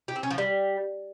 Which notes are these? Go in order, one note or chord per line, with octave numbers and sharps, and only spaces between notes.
G4
C4
C#4
F3
G3